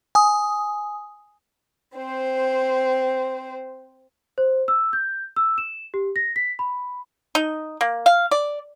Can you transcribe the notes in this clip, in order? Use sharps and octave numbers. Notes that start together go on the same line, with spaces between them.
G#5 D#6
C4 C5
C5
E6
G6
E6
E7
G4
A#6
B6
B5
D#4
A#3
F5
D5